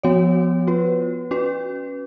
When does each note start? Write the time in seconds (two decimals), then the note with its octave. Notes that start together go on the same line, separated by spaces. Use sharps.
0.03 F3 B3 F#4 C#5
0.67 B3 F4 B4
1.31 C#4 F#4 B4